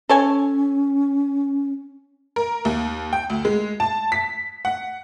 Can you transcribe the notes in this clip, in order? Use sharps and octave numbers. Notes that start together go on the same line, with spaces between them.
C#4 A4 C#5 G#5
A#4
D#2
G5
D2
G#3
A5
B6
F#5